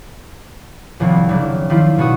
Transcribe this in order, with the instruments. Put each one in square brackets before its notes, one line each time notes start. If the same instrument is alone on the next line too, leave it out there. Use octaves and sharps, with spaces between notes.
[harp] D#1 C2 F3
F#1 D4
D#3 F3 D4 E4 F4
B2 B3 F#4 C#6 D#6